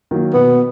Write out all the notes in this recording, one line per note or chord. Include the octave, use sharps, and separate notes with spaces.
D#3 F#3 A#3
B2 B3